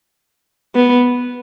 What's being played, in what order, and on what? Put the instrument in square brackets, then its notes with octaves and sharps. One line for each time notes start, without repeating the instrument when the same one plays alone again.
[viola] B3